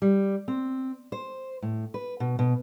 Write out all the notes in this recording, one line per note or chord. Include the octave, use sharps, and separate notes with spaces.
G3
C4
C5
A2
B4
B2
B2